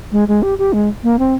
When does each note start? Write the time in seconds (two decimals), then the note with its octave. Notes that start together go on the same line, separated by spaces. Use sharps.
0.12 G#3
0.28 G#3
0.42 G4
0.58 G4
0.73 G#3
1.03 A#3
1.19 C4